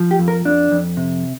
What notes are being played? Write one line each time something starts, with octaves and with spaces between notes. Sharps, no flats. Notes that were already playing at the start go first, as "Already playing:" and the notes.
Already playing: F3
G4
F2
A#4
F2 D4
F2
C3